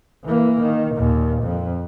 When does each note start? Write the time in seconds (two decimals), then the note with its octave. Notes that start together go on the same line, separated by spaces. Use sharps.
0.25 E3 A#3
0.62 D#3
0.96 D#2 A#2
1.43 F2